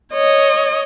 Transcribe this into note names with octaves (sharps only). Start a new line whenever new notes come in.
C#5 D#5